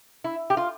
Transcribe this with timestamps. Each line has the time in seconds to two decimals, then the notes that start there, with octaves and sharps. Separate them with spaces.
0.24 E4
0.50 G4
0.57 F4